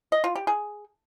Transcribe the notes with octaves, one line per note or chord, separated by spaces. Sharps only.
D#5
F4
G4
G#4